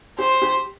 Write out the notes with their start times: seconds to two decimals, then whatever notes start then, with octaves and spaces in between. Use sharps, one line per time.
0.19 G4 C5
0.42 G4